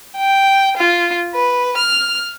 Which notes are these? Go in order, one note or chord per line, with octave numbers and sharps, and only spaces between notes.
G5
F4
B4
F6